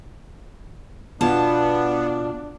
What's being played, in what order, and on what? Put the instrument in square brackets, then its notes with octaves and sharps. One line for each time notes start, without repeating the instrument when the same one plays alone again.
[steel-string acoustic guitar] B2 F4 A5 [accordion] B3 [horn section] D4